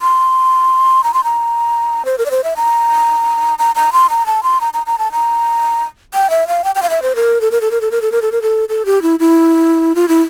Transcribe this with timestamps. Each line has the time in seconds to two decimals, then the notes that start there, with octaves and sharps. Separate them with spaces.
0.02 C6
1.04 A#5
1.14 C6
1.24 A#5
2.05 C5
2.18 A#4
2.26 D5
2.31 C5
2.44 E5
2.57 A#5
3.59 A#5
3.76 A#5
3.93 C6
4.10 A#5
4.26 A5
4.43 C6
4.61 A#5
4.74 A#5
4.86 A#5
4.99 A5
5.12 A#5
6.14 G5
6.30 E5
6.48 F5
6.64 G5
6.75 G5
6.82 F5
6.90 E5
7.02 C5
7.16 A#4
7.41 A4
7.51 A#4
7.61 A4
7.71 A#4
7.81 A4
7.91 A#4
8.02 A4
8.12 A#4
8.22 A4
8.32 A#4
8.42 A4
8.69 A4
8.86 G4
9.02 E4
9.20 E4
9.95 F4
10.08 E4